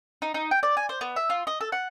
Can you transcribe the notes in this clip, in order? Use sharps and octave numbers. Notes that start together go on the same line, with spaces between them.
D#4
D#4
G5
D5
G#5
C5
B3
E5
F4
D#5
A4
F#5